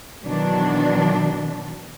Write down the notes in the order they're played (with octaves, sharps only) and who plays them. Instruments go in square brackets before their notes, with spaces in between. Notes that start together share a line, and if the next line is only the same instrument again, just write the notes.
[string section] B2 D#3 E3 F#3 D4